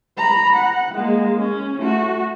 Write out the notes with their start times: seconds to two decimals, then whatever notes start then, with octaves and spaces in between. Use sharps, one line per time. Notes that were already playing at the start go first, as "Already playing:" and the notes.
0.18 A#5 B5
0.55 F#5
0.95 G#3 A#3
1.39 C#4
1.79 A3 F#4